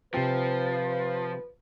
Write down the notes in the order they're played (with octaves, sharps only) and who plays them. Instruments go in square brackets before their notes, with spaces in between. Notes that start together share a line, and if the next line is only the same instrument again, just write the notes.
[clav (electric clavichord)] C3 C4 [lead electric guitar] F3 [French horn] B4